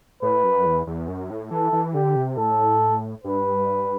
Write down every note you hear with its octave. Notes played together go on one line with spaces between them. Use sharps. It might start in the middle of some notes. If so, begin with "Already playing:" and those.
A2 B4
F#2
E2
E2
F#2
A2
E3 A4
E3
D3 G4
C3
A2 A4
G2 B4